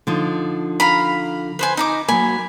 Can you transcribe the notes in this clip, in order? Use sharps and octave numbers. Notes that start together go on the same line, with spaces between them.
D3 F3 D#4
F5 A#5 B5
B4 C5 G#5
D#4 A#5 D6
F#3 A#3 G#5 B5